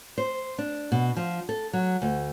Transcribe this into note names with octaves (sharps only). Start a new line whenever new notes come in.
C5
D4
B2
F3
A4
F#3
D2